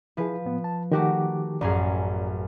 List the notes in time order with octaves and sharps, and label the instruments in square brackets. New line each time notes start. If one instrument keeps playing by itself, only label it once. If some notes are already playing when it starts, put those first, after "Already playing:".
[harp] F3 B4 [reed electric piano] E4 G#4
[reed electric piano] A2 B3
A5
[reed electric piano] D#3 G4 D6 [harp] A3 F#4 A#4
[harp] A1 F#2 G#4 [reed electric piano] D5 A#5